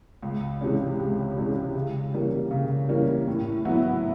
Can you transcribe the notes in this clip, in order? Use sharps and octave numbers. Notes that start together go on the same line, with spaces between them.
C#2
C3 E3 G#3 C#4
C#2
C3 E3 G#3 C#4
C#3
E3 G3 A#3 C#4
C#3
E3 G3 A#3 C#4
A2
F#3 B3 E4